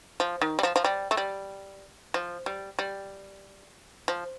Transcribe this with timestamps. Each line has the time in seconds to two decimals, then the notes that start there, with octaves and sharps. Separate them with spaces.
0.20 F3
0.41 D#3
0.59 G3
0.63 F3
0.76 F3
0.85 G3
1.11 A3
1.17 G3
2.14 F3
2.46 G3
2.79 G3
4.08 F3